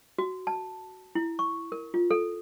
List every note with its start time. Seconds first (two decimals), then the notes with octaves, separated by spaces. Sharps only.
0.18 F#4
0.47 A5
1.15 E4
1.39 C#6
1.72 A#4
1.94 F4
2.11 A4